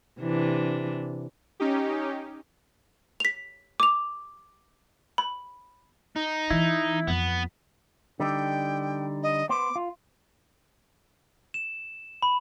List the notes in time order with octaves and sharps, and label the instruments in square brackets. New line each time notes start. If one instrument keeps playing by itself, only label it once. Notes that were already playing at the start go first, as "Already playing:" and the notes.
[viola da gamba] C3 E3 D4
[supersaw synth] C#4 D#4 G4
[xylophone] B6 F7
D6 F7
B5
[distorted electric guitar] D#4
[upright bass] E3 [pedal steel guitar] E4
[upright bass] F2 [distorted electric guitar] B3
[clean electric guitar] D3 G3 D#4 [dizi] G5
[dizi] D#5
[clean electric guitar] B3 C5 [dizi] D6
[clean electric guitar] F4
[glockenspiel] E7
B5